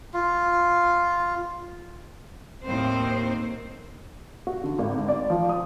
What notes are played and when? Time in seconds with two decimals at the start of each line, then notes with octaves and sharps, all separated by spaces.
0.14 F4
2.65 D#2 A2 C4 C5
4.47 F#4
4.64 D3
4.79 G#1
5.08 D5
5.30 F3
5.49 D#6